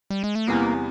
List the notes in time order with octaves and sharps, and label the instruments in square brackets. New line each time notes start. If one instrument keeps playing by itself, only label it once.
[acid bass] G3
G#3
A3
[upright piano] E2 C3 E3 G3 B3 [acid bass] A#3